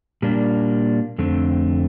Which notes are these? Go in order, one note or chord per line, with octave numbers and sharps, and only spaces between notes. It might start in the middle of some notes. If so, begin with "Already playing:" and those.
A#2 G3 A#3 D4
F2 D3 A3 C4